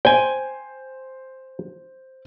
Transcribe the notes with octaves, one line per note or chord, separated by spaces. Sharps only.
C5 G5 G#5